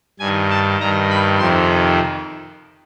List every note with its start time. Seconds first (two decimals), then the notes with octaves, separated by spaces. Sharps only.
0.19 G2 G#5
0.23 D#3
0.50 A5
0.80 G2 D#3 A#5
1.10 B5
1.39 F2 C3 D#3 C6